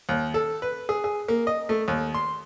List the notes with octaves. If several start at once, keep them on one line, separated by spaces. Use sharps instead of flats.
D#2
A4
B4
G#4
G#4
A#3
D#5
A3
D#2
C6